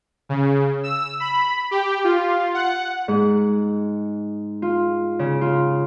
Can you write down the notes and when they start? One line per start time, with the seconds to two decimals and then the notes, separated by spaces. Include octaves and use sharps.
0.29 C#3
0.83 E6
1.20 B5
1.71 G4
2.04 F4
2.54 F#5
3.08 G#2
4.62 F4
5.19 C#3
5.41 F4